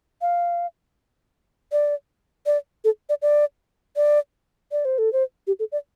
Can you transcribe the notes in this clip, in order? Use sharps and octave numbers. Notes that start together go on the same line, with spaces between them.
F5
D5
D5
A4
D5
D5
D5
D5
C5
A4
C5
G4
A4
D5